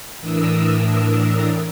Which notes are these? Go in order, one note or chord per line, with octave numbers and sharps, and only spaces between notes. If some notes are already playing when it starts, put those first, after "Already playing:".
A2 E3 D4 A#4 D#6 E6